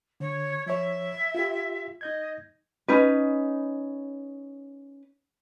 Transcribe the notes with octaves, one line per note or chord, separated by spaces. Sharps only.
D3 C#5
F3 C#5 E5
F4 G4
D#4 D#5 G6 G#6
C#4 D#4 B4